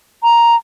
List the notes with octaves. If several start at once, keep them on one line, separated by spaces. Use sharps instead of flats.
A#5